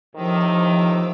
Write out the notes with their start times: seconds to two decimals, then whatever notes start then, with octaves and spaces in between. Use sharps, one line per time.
0.16 A2 C3 D#3 F3 D6 E6